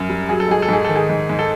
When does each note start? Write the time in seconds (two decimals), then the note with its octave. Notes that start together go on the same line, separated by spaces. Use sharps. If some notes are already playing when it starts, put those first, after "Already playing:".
Already playing: F#2
0.09 G3
0.29 F#3 G#4
0.40 A4
0.48 G#2 G#4
0.62 A4
0.69 G#2 G#4
0.85 D#3 A4
0.96 G#4
1.09 G#2
1.29 G#2
1.39 A4